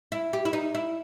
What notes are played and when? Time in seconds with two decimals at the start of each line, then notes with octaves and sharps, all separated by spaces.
0.12 E4
0.33 G4
0.45 E4
0.53 D#4
0.75 E4